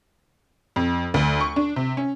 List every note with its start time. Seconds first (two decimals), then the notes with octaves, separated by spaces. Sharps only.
0.76 F2
1.14 D2
1.40 C#6
1.56 D4
1.76 C3
1.97 C#4